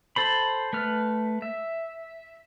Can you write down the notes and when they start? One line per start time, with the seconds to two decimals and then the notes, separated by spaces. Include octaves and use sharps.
0.16 A4 C5 B5
0.73 A3 B4 F6
1.42 E5